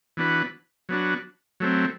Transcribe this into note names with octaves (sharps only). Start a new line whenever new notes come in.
E3 B3 D4 F#4 B4
F#3 B3 D4 F#4
F#3 A3 C4